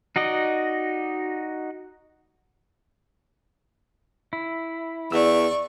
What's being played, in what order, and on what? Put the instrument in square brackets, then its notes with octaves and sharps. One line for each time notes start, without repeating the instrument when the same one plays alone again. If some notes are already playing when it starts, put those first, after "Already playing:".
[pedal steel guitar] D#4 F#4 D5 D#5
E4
[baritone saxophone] E2 [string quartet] D5 C#6 [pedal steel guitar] E6